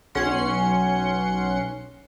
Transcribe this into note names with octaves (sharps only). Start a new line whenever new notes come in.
B1 C#4 F#5 C6 C#7